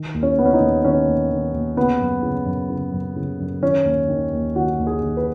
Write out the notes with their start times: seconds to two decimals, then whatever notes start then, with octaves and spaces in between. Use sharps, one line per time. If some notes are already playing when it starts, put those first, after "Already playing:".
Already playing: D#3
0.14 D#2
0.23 C#4
0.38 D#3 B3
0.46 C#4
0.53 D#4
0.60 D#2
0.84 D#3 C#4
1.08 D#2
1.31 D#3
1.53 D#2
1.76 C#3 B3
2.00 F#2
2.23 C#3
2.46 F#2
2.70 C#3
2.93 F#2
3.16 C#3
3.40 F#2
3.62 D#3 C#4
3.85 D#2
4.08 D#3
4.33 D#2
4.56 D#3 F#4
4.79 D#2
4.87 G#4
5.02 D#3
5.17 B4